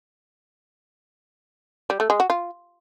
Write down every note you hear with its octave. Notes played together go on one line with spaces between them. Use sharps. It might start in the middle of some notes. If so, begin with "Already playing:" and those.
G3
A3
G#3
F#4
F4